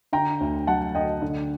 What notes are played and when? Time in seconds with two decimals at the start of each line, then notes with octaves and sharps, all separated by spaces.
0.13 D3 G5 A#5
0.41 D2
0.67 F#3 F#5 A5
0.95 D2 D#5 G5
1.22 D3